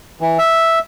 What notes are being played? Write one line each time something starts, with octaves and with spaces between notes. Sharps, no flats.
E3
E5